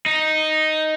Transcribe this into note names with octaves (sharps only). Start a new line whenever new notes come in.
D#4